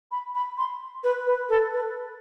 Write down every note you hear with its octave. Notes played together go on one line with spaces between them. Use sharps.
B5
B5
C6
B4
B4
A4
B4